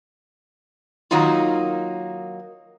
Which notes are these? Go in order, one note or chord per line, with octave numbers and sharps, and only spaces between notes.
D#3 F#3 A#3 D#4 F4